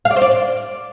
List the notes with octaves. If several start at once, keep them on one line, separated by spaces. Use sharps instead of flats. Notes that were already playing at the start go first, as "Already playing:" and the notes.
F5
D5
C5
D5